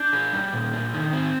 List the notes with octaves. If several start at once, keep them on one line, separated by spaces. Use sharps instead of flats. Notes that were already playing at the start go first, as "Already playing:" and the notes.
Already playing: D4 G6
G#4
G3
A#2
D4
D#3
C4